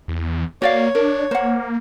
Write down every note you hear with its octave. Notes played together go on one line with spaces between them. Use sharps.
E2
A#3 F#4 C#5 D5 F5
D4 A#4
A#3 C5 F#5